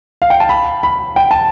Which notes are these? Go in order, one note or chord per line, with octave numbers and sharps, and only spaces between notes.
F5
G5
A5
B5
B5
G5
A5